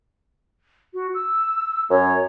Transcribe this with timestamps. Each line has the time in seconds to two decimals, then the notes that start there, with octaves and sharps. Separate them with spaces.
0.94 F#4
1.14 E6
1.90 F#2 C#5